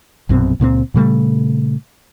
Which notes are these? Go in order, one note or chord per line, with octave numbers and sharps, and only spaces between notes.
A#1 F#2 B2 C4
C#2 A#2 G#3 C4
A#2 C#3 G3 A3